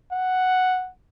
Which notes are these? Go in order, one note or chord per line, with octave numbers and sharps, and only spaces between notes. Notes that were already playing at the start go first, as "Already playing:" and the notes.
F#5